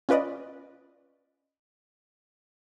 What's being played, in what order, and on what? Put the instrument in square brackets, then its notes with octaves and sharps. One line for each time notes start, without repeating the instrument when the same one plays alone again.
[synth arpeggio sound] C#4 F4 B4 D5 D#5